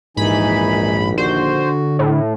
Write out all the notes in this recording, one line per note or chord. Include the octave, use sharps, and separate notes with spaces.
A#1 D#2 G#2 E3 D#4 G#5 B5
D3 F#4 C5
A2